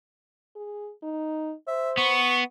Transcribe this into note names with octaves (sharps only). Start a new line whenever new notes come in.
G#4
D#4
C5 E5
B3 C#6